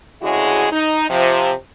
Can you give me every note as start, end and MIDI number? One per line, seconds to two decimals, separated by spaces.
0.22 0.67 38
0.22 0.67 49
0.22 0.67 56
0.22 0.67 64
0.22 0.67 66
0.22 0.67 68
0.72 1.06 63
1.09 1.52 48
1.09 1.52 53